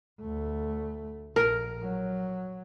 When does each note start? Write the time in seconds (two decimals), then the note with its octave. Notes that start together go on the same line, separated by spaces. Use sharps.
0.21 D2 A3
1.36 A#1 A#4
1.82 F#3